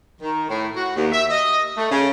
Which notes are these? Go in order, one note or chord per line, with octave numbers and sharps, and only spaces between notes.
D#3
A2
F#4
D#2
E5
D#5
A3
C#3